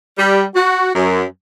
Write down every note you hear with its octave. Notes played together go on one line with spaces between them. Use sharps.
G3
F#4
F#2